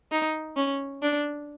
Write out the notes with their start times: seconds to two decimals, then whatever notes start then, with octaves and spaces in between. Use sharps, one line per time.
0.12 D#4
0.56 C#4
1.02 D4